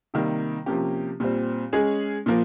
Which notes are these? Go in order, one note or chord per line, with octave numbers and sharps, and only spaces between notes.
C3 D#3 G3 A#3
C3 F3 A#3 C#4 G4
A#2 G3 C4
G#3 C#4 G#4
A#2 F3 A#3